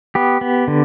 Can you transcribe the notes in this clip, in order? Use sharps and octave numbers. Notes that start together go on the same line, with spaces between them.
B3 G4
B3
D3